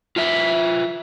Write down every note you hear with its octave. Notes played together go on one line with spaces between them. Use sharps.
F4 B4 E5